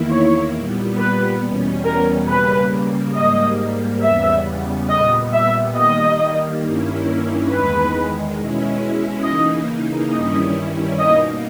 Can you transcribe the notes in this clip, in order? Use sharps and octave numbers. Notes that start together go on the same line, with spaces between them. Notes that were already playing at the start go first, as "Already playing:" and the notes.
Already playing: E2 D#3 A#3 E4
C#5
A#2 G3 B3
B4
E2 B2 G3 C#4
A#4
C#3 G3 A#3 B4
G#2 G3 A#3 D#5
E2 C#3 G3 B3 E5
A#2 G3 B3 D#5
E5
D#3 G3 A#3 D#5
G2 D#3 A#3 C#4 E4
E2 D#3 G#3 B4
B2 G#3 C#4 E4
C#3 E3 A#3 D#4 D#5
G2 D#3 G3 C#4 E4 D#5
B2 A#3 D#4 D#5